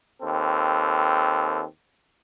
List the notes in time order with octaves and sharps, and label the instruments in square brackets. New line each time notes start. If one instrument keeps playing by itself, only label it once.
[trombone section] D#2 C4 A4